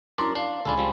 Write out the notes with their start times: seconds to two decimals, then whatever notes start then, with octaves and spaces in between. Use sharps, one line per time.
0.18 F#2 D4 E4 A#4 D5 A#5 C6
0.35 D4 F5 C7
0.65 C#2 D4 F4 A4 G#5 B5
0.78 F3 G3 C4